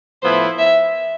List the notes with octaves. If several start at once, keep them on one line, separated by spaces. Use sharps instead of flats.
A2 F3 B3 E4 C5
E5